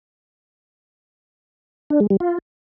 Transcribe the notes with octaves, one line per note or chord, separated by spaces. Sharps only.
D4
G#3
G3
F4